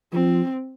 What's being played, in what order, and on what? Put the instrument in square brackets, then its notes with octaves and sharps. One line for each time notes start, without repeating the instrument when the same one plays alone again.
[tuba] F3 [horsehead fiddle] C4